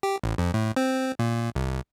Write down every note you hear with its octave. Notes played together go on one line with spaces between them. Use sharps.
G4
A1
F2
A2
C4
A#2
C2